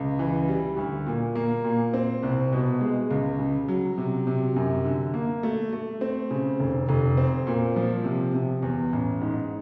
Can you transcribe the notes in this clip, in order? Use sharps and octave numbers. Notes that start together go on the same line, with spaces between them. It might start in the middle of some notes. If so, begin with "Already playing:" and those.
Already playing: C#2
E3
G3
D2
A#2
A#3
A#2
C4
C2
B2
G#3
C#2
C#3
F#3
C3
C3
F#2
D3
A#3
A3
A3
C4
C#3
F1
F1
C4
A#2
F3
C3
C3
E2
A1
G#2